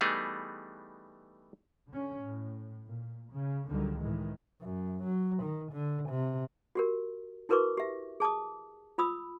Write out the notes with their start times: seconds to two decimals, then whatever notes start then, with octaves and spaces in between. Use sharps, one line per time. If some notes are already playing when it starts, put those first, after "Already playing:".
0.01 E3 G3 A3 B3 D#4 G#4
1.89 D3 C#4
2.24 A2
2.88 A#2
3.31 C#3
3.68 C#2 D3 D#3 F#3 G3
4.00 A2 D#3 E3 G#3
4.61 F#2
5.04 F#3
5.42 D#3
5.72 D3
6.09 C3
6.75 F#4 G4 A#4
7.49 E4 F#4 A#4 B4 C#6 D6
7.77 G4 E5
8.20 G#4 A5 D6 D#6
8.98 F4 B5 D#6 E6